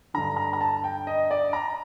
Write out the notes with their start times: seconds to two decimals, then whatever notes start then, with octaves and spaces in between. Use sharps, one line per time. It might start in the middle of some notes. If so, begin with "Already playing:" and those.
0.14 G2 D3 A#5
0.37 A#5
0.53 A#5
0.61 A5
0.84 G5
1.07 D#5
1.31 D5
1.53 A#5